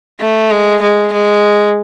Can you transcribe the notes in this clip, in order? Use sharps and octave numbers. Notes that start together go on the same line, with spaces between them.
A3
G#3
G#3
G#3